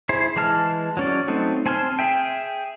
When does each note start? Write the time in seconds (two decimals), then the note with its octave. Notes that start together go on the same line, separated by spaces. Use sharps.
0.09 E4 G#4 C5
0.36 E3 G#3 A5 F6
0.97 F#3 C#4 D5
1.28 F#3 A3 C4 D#4
1.66 C4 G#5 A5 C6 F6
1.99 G#4 E5 G5